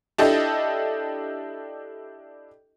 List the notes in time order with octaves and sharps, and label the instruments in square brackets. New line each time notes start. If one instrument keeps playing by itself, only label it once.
[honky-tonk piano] D4 E4 G4 A4 D#5